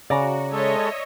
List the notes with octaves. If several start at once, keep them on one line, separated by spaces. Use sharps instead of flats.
C#3 F#4 D5 A#5
G#3 A4 C#5 D#5 E5